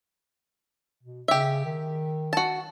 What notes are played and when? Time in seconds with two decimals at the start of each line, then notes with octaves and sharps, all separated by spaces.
1.03 B2
1.28 C#3 G4 E5
1.65 D#3
2.33 F#4 A5